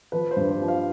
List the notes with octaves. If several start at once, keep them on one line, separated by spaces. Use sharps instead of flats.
F3 B4
C5
G2
C5
F3
F5